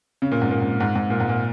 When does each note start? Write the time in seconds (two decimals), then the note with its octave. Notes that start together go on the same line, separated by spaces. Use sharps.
0.22 C#3
0.31 A#2
0.42 G#2
0.51 A#2
0.61 G#2
0.80 G#2
0.95 G#2
1.10 A#2
1.20 G#2
1.29 A#2